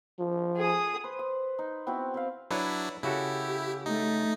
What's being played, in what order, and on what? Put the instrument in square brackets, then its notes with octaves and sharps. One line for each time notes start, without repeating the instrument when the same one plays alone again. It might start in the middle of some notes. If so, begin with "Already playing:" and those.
[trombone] F3
[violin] G#4 D#6
[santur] B4 C5
D#6
D#4
B3 C4 E4 F#4
C4 B4 F5
[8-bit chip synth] F#3 D4 E4 [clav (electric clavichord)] B4 C#5
[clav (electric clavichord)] C#3 F#4 A4 [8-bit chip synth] E4 [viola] G4
[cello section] A3 [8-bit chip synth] D#4